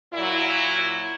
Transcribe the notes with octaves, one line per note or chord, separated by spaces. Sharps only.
A#2 F#3 E4